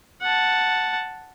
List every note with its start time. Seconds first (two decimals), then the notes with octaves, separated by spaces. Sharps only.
0.22 F#5 A5